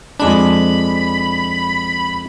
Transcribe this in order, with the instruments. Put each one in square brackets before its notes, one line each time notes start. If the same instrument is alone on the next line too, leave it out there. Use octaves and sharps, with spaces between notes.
[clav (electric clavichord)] F2 G#3 D4 [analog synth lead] B5